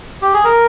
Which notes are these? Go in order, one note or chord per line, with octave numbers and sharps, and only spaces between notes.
G4
G#4
A#4